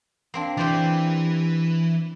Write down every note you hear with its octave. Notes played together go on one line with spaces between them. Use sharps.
A#3 C4 D4
E3 G4 C5 D5